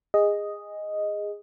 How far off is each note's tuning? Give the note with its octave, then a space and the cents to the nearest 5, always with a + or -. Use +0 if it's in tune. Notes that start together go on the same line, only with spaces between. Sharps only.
G#4 -20 D#5 +0